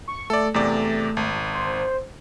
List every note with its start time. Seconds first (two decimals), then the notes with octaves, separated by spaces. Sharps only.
0.08 C#6
0.30 A3 A4 D5
0.54 E2 C3 A3 D5
1.17 G#1
1.53 C5